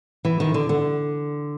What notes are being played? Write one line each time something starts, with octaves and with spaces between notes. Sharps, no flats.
E3
D#3
D3
D3